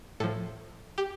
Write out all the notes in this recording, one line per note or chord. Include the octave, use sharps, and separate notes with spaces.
A2 F3 A4
G4